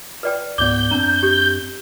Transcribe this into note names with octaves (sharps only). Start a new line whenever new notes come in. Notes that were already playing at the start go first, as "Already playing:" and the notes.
B4 D5 G5
C#2 G#2 B3 D5 D6 G6
F#2 C4 D4 A#5
G4